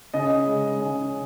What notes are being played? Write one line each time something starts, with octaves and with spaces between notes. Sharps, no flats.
C#3 D#5
G#3
C#3